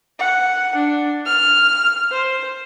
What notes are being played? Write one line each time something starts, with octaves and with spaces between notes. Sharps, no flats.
F#5
D4
F6
C5